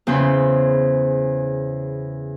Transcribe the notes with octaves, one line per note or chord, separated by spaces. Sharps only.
E2 C#3 C#4 C5 B5 C6